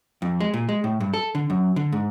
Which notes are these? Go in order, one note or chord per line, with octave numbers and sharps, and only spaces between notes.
F2
G#3
A#2
G#3
A2
G2
A4
D3
F#2
D3
G#2